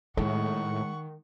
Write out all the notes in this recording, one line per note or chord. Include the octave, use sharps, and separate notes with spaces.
A2 D#3 G#3 F#5 C#6